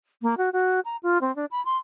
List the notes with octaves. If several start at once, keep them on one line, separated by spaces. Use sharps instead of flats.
A#3
F#4
F#4
A#5
F4
C4
D4
B5
C6